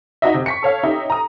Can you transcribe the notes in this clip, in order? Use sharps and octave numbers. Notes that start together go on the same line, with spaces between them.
D#4 F#4 D#5 E5
C3
C#6 B6 C#7
A4 C#5 F5
C#4 D#4 G4 E5
A#5 D#6